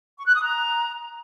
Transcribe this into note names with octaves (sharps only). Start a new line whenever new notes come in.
C#6
F#6
D#6
A#5